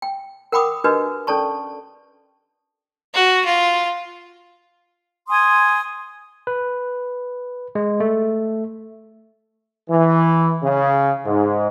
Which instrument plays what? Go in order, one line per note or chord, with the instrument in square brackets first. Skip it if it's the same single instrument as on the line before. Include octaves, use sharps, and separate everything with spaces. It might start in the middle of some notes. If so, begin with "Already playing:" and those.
[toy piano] G5
A#4 F#5 G5 B5 D6 D#6
D4 F#4 G4 A#4 B4 D#5
C#4 A4 D5 A5 C#6
[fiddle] F#4
F4
[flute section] G#5 C6 D#6
[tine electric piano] B4
G#3
A3
[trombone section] E3
C#3
G#2